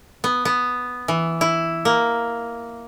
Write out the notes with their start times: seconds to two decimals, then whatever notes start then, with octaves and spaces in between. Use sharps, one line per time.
0.24 B3
0.45 B3
1.08 E3
1.41 E4
1.85 A#3